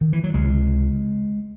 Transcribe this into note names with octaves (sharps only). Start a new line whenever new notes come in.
D#3
E3
F#3
C#2 C3 G#3